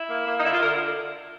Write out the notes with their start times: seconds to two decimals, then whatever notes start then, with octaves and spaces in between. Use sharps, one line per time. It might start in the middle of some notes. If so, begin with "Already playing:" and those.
Already playing: E4
0.08 A#3
0.26 A#3
0.39 D#4
0.44 D3 E4
0.52 F4
0.61 D3 A#4